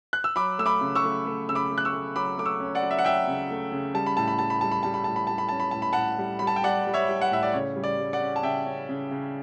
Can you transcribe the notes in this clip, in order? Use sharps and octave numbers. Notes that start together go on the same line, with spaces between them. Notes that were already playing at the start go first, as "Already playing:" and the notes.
F#6
E6
F#3 B5 D6
A3 E6
B5 D6
C#3
C#6 E6
A3
A3
C#3 E6
B5 D6
A3
F#6
C#6 E6
A3
F#3 B5 D6
A3 D6
C#6 E6
C#4
D5 F#5
F#3
E5
F#5
F#3 E5 G5
C#3
A3
C#3
G3 A5
B5
A2 A5
B5
G3 A5
B5
G3 A5
B5
G3 A5
B5
A2 A5
B5
G3 A5
B5
C#4 A5
B5
A2 A5
B5
A2 F#5 A5
G3
G3 B5
A5
G5
G3 D5 F#5
G3
C#5 E5
G3
F#5
A2 E5
D5
C#3 C#5
G3
D5
G3
D5 F#5
C#4
A5
C#3 E5 G5
C#4
C#3
C#3